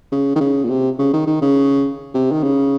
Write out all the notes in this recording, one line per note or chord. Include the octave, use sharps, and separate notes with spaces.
C#3
D#3
C#3
A#2
C3
C#3
D#3
D#3
C#3
C3
D#3
C#3